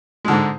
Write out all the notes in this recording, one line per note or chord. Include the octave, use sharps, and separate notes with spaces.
G#2 D3 G#3